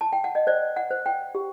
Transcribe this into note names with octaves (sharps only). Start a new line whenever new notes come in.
A5
G5
F#5
D#5
C5 D5
F#5
C5
G5
G4